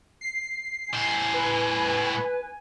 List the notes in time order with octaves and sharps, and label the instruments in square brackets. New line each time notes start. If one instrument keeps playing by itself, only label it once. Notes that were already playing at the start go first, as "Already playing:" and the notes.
[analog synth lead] C7
[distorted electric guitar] A2 C5 [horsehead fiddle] G#5
[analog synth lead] B4